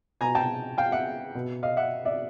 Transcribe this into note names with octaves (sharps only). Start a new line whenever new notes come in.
B2 G#5 A#5
G5 A5
F5 G5
E5 F#5
B2
D#5 F5
E5 F#5
D5 E5